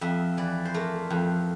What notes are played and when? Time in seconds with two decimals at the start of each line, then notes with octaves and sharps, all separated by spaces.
0.01 F2 E5
0.37 E3 D5
0.65 C5
0.74 A3 A#4
1.10 F2